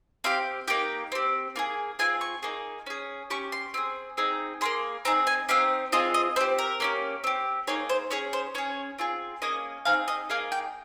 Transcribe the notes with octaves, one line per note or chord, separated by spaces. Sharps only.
C4 G4 F5
A#3 D#4 G4 G5
C4 G4
A#3 F4 G#4
C4 F4 G#4 G#5
C#6
A#3 D#4 G#4
C#4 G#4
C#4 G4 C#6
C6
C4 F4 G#4
C4 D#4 G#4
A#3 C#4 G#4 C6
C4 D#4 G#4 A#5
G#5
C4 D#4 G4 F5
C4 F4 G#4 D#5
D#5
C4 G4 C5
A#4
A#3 C#4 G4
C4 G4
A#3 D#4 G#4 C#5
C5
C#4 G#4 C#5
C5
C#4 G#4 C#5
C4 F4 G#4
A#3 C#4 G#4 D#5
C4 D#4 G#4 F5
D#5
A#3 D#4 G#4 F5
G5